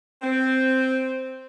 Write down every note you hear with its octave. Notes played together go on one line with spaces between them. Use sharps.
C4